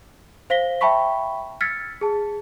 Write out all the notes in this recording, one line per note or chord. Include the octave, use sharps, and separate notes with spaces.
C5 F5 A#6 B6 G7
E5 G5 A5 B5 C#6 B6
E6 F6 G#6 A6 B6 C#7
G#4 A5